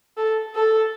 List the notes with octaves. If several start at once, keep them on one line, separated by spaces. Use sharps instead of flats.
A4
A4